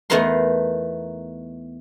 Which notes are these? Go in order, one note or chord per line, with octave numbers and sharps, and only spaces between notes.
E2 A3 B3 D#4 A#4 C6